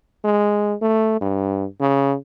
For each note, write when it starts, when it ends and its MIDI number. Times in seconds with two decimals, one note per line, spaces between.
0.25 0.74 56
0.82 1.16 57
1.21 1.65 43
1.80 2.15 49